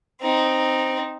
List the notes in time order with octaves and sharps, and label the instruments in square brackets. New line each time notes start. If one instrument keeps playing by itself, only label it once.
[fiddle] C4 D#4